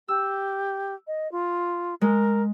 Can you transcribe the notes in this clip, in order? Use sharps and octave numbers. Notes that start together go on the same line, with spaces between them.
G4 E6
D#5
F4
G#3 A#4